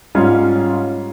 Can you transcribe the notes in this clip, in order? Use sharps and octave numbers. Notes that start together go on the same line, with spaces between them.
G#2 G3 C#4 F4